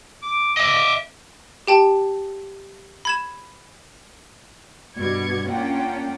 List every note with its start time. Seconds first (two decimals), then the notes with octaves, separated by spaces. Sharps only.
0.22 D6
0.57 D#5 E5 D6
1.67 G4 G5 A5
3.05 B5 G#6 E7
4.96 G2 B2 D5 G#6 C#7
5.48 A#3 C#4 D4 F4 F#5 G5